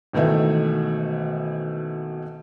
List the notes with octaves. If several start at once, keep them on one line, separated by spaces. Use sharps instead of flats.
G#1 B2 D#3 E3 A3 E5